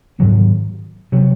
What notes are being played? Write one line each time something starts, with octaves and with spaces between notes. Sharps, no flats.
G#2 D#3 F#3 C4
C3 F#3